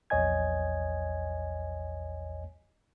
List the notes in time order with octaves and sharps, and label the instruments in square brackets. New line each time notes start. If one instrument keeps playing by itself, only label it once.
[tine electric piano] A#1 E2 C#5 D#5 G#5 G#6